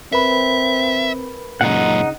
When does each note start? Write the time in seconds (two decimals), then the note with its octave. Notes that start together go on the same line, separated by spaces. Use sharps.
0.12 C4 A#4 B4 E5 B5
1.61 F#2 A#2 C#3 D#4 F#5